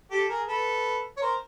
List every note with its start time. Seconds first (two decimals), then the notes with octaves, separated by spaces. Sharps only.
0.11 G4 A4
0.29 G#4 A#4
0.48 A4 B4
1.17 C#5
1.21 A#4 C5